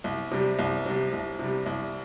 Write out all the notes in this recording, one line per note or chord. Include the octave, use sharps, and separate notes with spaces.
C2
C3 G3
C2
C3 G3
C2
C3 G3
C2